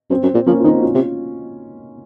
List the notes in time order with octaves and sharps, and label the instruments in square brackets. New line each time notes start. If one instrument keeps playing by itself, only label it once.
[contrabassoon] F#2 [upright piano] C4
[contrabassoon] F#2
A#2
[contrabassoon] F3 [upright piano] A#3 C#4
[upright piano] F4
[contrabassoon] D#3 [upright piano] C4 D#4
[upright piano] F#4
C#4 F4
[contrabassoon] C3